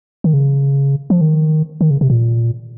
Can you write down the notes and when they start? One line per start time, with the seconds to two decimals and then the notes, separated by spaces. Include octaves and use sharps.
0.24 D#3
0.34 C#3
1.10 F3
1.21 D#3
1.81 D#3
1.91 C#3
2.01 C3
2.10 A#2